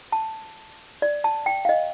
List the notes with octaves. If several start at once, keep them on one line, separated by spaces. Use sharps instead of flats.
A5
D5
A5
G5
F5
D#5